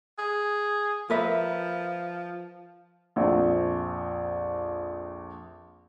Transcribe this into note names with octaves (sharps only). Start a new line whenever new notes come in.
G#4
F3 A#4 B4 E5
A#1 F2